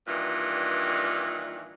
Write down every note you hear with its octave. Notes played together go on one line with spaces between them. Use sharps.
G2 A#2 D#3 E3